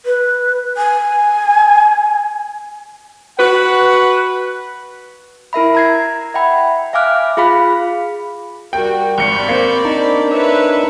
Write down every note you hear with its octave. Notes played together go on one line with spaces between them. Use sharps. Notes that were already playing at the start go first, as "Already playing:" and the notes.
B4
G#5
F#4 B4 F#5
E4 A#4 E5 B5
A#5 G#6 C7
E5 F#5 G5 B5
E5 F5 G#5 D6 F6 F#6
F4 G#4 F5 B5 B6
G3 F#4 A#4 G5
G#1 C4 D5 B5 C#6 F6 G6 C#7
A#3 C5
D4 D#4 A#4
B4 C#5 E5